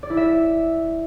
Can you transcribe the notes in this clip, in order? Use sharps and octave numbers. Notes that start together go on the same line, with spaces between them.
D5
E4
E5